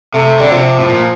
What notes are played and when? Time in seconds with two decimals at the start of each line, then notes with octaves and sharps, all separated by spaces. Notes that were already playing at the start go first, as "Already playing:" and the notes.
0.14 C3 A3
0.40 D3 G3
0.51 C3 F3
0.80 A2
0.88 A#2